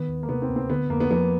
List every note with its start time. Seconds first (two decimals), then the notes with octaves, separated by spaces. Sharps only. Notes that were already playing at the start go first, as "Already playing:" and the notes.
Already playing: D#3 B3
0.08 D#2
0.23 A#3
0.29 C3 B3
0.42 C4
0.50 D2
0.56 C4
0.70 D3 B3
0.90 F2 A#3
1.00 B3
1.11 F3 B3